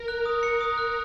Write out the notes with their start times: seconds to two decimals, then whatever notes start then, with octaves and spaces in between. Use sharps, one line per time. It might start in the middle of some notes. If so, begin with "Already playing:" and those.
Already playing: A#4
0.08 F#6
0.26 D#6
0.43 C#7
0.61 D#6
0.78 F#6